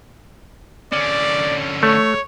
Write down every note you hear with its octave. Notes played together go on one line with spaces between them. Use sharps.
D3 C#4 D5
A3 C#5